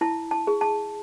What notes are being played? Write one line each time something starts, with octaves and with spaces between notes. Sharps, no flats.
E4 A5
A5
G#4
A5